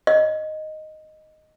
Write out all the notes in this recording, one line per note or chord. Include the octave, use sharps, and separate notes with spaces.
D#5